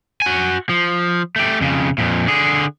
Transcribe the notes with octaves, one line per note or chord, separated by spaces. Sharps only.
F#4 G#5
F3
A3 G4
F2 C#3
F2 A#2
D3 G#4